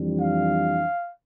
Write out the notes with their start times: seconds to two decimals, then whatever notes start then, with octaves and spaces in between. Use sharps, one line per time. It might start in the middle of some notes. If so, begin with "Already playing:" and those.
Already playing: F2 E3 G3 D4
0.21 F5